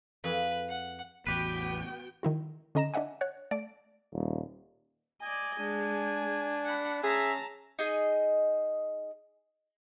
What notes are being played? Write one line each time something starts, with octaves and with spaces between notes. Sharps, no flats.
F2 G#4 B4
F#5
A1 E2 B3 F#4 G4 B4 G5
D#3 E4 F#4
D3 C#4 D#5 A#5 A#6 E7
D4 D#5 E5 F#5 G#5
C#5 F#5 F#6
A3 D5 D7
D#1
D5 D#5 G#5
G#3 D4
F#5 B5
C#4 G#4 E5 A5 A#5
D#4 G#4 D#5